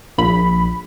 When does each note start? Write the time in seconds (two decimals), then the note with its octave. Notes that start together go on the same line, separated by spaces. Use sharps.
0.18 A#1 B5